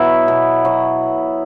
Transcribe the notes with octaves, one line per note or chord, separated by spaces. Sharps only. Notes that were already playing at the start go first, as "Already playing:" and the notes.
Already playing: B2 F#3 B3 E4
B2
F#3